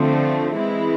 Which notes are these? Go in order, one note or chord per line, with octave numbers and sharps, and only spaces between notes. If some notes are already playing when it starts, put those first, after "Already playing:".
Already playing: D3 F3 A3 C4
E3 G#3 C4 E4